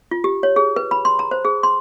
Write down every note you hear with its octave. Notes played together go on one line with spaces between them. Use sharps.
F4
G4
C#5
G#4
B4
B5
C6
A#5
C5
G#4
C6